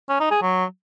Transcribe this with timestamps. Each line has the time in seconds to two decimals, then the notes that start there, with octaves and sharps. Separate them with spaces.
0.09 C#4
0.20 D#4
0.31 G#4
0.42 F#3